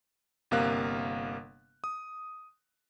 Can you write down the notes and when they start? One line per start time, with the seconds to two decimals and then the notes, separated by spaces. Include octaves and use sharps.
0.51 G1 C3 A#3 A#4 F5 F#6
1.84 D#6